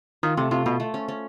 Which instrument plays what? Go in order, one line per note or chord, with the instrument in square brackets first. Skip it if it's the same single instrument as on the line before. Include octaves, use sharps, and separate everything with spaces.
[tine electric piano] D#3 [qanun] F4
[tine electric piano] C3 [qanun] A3
[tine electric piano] C3 [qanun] F4
[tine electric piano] B2 [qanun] F4
[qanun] A3
C#4
C#4